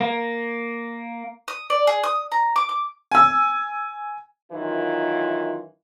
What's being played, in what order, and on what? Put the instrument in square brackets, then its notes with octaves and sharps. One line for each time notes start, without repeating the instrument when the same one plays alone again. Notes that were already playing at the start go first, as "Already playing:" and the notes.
[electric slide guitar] A#3
[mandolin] D#6
D5
G#4
D#6
A#5
D6
D6
[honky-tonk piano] G#5 E6
[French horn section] F#2 D#3 E3 F4